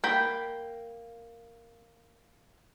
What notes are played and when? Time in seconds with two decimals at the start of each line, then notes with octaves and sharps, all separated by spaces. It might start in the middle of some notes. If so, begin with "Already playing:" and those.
0.04 A#3 G5 B5